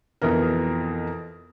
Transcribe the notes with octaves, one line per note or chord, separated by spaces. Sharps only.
F2 B2 E3 A#4